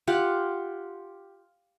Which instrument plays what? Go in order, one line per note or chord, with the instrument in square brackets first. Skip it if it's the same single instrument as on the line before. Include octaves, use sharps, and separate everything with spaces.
[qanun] F4 G4 F#5